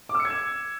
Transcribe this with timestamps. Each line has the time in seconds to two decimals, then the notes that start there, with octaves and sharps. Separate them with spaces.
0.09 D6
0.15 E6
0.20 C#7
0.25 G#6
0.30 E7